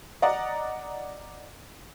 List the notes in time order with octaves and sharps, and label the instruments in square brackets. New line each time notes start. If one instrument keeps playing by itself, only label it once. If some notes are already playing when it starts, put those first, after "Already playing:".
[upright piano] D5 D#5 F#5 A#5